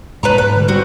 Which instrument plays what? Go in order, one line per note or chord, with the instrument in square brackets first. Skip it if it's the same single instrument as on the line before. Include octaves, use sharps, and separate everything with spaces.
[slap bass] G#2 [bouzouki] B4 A5 A#5
[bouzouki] B4
[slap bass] D3 E3 G3
[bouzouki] C4 F#4